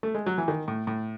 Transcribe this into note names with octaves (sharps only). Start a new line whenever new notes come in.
A3
G#3
F#3
E3
D#3
A2
A2